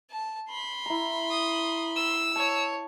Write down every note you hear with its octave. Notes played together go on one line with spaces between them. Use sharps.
A5
B5 C6
E4 A#5
D#6
E6
C#5 A5